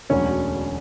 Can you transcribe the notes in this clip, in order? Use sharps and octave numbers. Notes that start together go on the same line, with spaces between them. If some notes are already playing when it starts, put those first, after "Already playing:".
E1 D2 D3 F#3 C#4 C#5